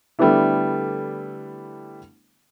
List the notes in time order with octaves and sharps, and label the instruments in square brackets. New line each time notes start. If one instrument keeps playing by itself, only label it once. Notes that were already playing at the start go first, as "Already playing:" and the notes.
[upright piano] D3 G3 A3 B3 D4 E4